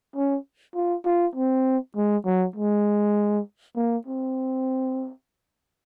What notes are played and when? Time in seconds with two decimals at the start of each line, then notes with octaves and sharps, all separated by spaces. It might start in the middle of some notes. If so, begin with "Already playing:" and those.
0.16 C#4
0.75 F4
1.05 F4
1.35 C4
1.96 G#3
2.25 F#3
2.56 G#3
3.76 A#3
4.07 C4